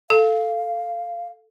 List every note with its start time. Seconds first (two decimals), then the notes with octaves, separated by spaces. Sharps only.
0.10 A4 F5